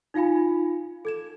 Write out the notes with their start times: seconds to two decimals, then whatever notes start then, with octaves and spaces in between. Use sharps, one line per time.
0.14 D#4 F4 F5 G#5 B5
1.05 A4 G#6 E7